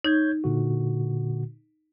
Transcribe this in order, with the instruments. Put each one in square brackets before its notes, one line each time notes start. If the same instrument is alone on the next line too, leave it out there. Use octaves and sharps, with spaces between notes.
[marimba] D#4 [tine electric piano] C#5 G6 G#6
[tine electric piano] A#2 D3 F#4